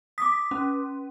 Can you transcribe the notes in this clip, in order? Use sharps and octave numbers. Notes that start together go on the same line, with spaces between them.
D6 D#6 B6
C#4